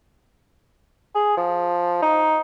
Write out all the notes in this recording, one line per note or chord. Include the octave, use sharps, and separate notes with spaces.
G#4
F3
D#4